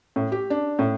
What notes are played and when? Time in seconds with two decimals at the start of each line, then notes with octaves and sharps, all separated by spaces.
0.16 A2
0.32 G4
0.50 D4
0.79 A2